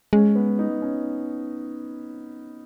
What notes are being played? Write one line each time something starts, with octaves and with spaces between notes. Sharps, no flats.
G#3 C#4
B3
D#4
C#4